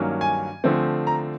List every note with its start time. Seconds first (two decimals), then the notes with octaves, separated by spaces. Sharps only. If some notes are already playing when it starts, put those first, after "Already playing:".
Already playing: G2 D#3 F#3 A#3 C#4
0.21 G#5
0.64 D3 F3 A3 C4
1.07 A#5